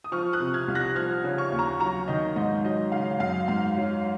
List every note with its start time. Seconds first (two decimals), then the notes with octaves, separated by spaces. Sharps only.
0.04 D#6
0.12 F3 C#6 F6
0.33 D#6 F#6
0.40 C3
0.54 F6 G#6
0.68 C2
0.75 F#6 A#6
0.96 F3 F6 G#6
1.24 C#3
1.38 C#6 F6
1.52 D#2
1.59 A#5 C#6
1.80 F#3 A#5 C#6
2.08 D#3 D#5
2.36 G#2 D#5
2.64 F#3 D#5
2.92 C#3 F5
3.20 F#2 F5
3.48 G#2 F5
3.77 F#3